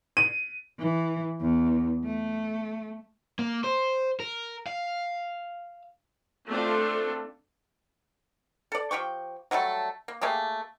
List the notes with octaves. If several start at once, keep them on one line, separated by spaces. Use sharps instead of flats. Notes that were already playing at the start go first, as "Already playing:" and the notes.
D#7
E3
E2
A3
A#3
C5
A#4
F5
A3 C4 D4 F4 A4
A4 D5
F3 G4 G5 C#6
F#3 G3 A3 A4
A#3
A3 A#3 G4 G#4